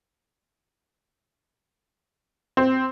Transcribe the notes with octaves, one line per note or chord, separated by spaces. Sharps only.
C4